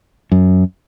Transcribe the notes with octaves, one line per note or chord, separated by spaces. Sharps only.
F#2